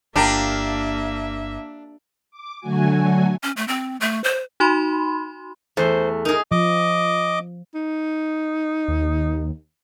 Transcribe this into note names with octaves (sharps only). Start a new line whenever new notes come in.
G1 A#3 D4 F4 G4 A#4 E5
D6
D3 F#3 A3 F#4 G#5
C#4
A3
C4
A3
C5
D#4 F#4 B5 C6
E2 A3 C5
D#4 G#4 A#4
F3 D#5 D6
D#4
D#2